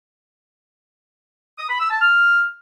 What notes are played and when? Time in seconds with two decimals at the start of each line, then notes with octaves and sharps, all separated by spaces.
1.58 D#6
1.69 B5
1.80 E6
1.90 A5
2.01 F6